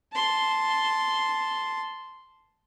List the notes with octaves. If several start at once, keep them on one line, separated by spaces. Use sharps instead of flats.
A5 C6